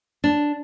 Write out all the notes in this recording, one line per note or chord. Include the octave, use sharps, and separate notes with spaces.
D4